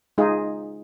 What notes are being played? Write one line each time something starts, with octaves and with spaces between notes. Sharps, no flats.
G#3 D#4 F4 G#4